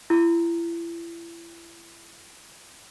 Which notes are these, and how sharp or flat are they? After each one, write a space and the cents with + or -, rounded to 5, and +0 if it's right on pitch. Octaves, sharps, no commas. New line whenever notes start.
E4 +35